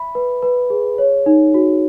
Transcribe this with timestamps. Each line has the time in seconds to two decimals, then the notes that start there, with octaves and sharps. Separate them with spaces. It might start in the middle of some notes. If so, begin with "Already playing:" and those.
Already playing: E5 B5
0.15 B4
0.42 B4
0.70 G#4
0.98 C#5
1.26 D#4
1.54 F#4